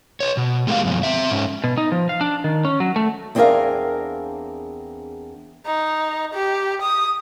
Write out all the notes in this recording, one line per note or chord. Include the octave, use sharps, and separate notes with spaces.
B4 C#5
B2
A2 G#3 A#3 C#4 G4 F5
F#2 B2 F3
C4 E5
G#2 C#4
B2
D#4
F3
F5
D4
D#3
C#4
F#3
A3
E2 C4 D4 G#4 A#4 F5
D#4
G4
D#6